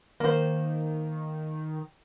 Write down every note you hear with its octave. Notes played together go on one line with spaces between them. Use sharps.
D#3 A#3 C5